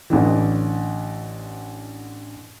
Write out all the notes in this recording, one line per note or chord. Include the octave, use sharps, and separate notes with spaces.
A1 D3 E3